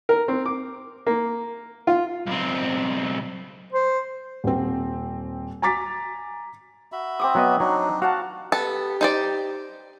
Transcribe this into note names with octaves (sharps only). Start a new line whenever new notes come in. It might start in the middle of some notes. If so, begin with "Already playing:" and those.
A#4
C4
D6
A#3
F4
B1 C4
C5
D#1 C4
G#5 A#5 D6 A6 B6
F#4 E5 B5
C4 D6 D#6
F#3 B3 D#5
F#3 D4 D#4
F#4 F5 F#5 A5
B3 G4 A4
D#4 C5 D5